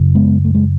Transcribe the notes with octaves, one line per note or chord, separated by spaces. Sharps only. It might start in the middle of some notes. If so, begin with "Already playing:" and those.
Already playing: F#2 C#3
G#3 B3
A3
G#3